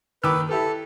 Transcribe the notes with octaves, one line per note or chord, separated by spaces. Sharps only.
D#2 D#3 B4 D6 E6
E4 G4 A4 B4